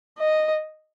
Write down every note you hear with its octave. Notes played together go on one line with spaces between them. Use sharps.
D#5